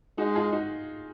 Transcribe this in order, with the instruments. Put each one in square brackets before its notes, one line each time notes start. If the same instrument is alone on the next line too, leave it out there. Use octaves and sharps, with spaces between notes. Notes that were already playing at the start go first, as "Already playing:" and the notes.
[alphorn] G#3 [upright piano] D#4 F#4
[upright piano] F4 G#4
D#4 F#4